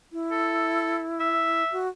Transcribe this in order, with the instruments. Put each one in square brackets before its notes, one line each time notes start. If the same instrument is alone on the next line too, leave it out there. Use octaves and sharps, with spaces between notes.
[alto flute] E4
[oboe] A4
E5
[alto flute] F#4